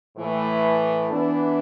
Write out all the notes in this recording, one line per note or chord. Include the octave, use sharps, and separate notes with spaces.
A2 E3 A3
E3 B3 D4